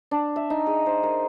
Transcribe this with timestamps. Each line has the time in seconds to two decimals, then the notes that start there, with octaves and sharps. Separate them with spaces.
0.11 D4
0.36 E5
0.50 D#4
0.66 G#4
0.86 C5
1.03 A#4